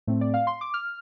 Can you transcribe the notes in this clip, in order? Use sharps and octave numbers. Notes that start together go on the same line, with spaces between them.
A2 A3 C4
D5
F5
C6
D6
F6